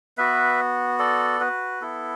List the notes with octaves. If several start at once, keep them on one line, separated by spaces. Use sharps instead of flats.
B3 F#4 B4 E5
A4 D5
F#4 B4
B3 E4 A4